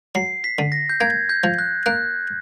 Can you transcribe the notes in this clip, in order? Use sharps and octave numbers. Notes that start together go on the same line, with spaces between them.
F#3 C7
B6
D3
A#6
G6
A#3 G#6
G6
F3
F#6
A#3 F#6